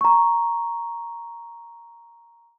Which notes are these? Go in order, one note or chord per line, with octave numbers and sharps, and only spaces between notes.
A#5 C#6